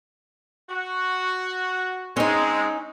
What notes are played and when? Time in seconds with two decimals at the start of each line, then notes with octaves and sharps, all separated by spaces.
0.70 F#4
2.17 G#3 C4 C#4 D#4